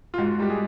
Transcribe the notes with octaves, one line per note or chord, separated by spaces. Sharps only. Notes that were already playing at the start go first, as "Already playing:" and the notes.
F4
G#2 F#4
G3 G4
G#4